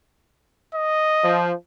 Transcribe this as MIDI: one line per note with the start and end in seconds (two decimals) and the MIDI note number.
0.75 1.40 75
1.23 1.52 53